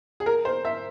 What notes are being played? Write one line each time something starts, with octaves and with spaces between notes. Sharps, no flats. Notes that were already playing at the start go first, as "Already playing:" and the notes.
G#4
A#4
C5
E5